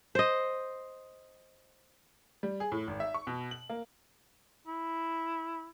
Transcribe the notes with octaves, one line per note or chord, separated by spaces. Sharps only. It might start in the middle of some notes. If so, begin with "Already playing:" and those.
C5 D#5
G3
G#4
A2
G#1
E5
C#6
B2
F#7
A#3
E4